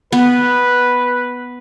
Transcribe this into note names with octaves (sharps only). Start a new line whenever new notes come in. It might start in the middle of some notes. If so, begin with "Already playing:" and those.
B3 B4